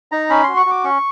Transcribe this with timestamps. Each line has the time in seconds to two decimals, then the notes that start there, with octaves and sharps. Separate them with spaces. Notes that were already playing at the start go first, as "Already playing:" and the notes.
0.12 D#4 A#5
0.30 C#4 B5
0.43 F#4 C6
0.57 C#6
0.66 F#4 D6
0.84 C#4 C#6